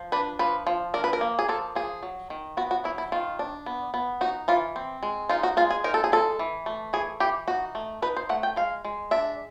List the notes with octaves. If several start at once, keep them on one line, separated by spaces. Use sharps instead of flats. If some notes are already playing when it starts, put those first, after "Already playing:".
Already playing: F3
D4 B4
F3 B4
F3
D4 A#4
B4
A#4
A#3
G#4
F3 A4
F3 G#4
F#3
D#3
B3 F#4
F#4
F#3 E4
E4
D#3 F4
D4
B3
B3
D#4 F#4
E3 F4
C4
G#3
D#4 F4
F#4
G#3 F4
G#4
D#4 A#4
A4
G#4
G#3 A4
E3
A3
E3 G#4
E3 G4
D#4 F#4
A3
D#4 B4
C5
A3 F#5
G5
G#3 F5
G#3
D4 E5